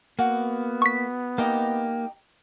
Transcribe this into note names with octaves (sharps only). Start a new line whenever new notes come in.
A#3 B3 F#4
C#6 B6
A#3 D#4 G4 D#5